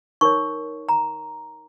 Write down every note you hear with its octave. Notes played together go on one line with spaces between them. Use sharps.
D#4 A#4 C#5 C#6
A#5